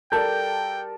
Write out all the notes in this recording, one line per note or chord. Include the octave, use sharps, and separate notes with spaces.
G3 A4 A#4 D5 G5 A5 G6